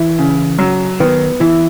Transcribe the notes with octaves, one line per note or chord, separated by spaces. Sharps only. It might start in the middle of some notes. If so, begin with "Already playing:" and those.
Already playing: E3 E4
C#3
F#3
D#3 B3
E3 E4